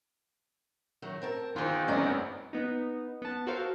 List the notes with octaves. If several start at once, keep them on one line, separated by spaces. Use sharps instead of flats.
D#3 F#3 A3
C4 A#4 A5
E2 D#3 F4 C5
G#1 F#2 B3 C4 D5 D#5
B3 D#4
B3 A5
F#4 A4 A#4 C5 F5